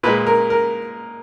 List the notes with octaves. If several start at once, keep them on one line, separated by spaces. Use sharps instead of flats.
A#2 G#3 B4
A#4
A#4